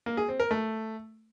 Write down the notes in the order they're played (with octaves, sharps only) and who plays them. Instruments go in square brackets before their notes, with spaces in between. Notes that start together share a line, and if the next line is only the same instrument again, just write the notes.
[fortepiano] A#3
G#4
C4
A#4
A3